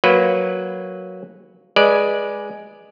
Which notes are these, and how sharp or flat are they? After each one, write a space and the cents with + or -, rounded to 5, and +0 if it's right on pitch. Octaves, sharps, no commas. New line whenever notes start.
F#3 -5 A#3 +0 B4 +0
G#3 +0 B4 -15 D5 +0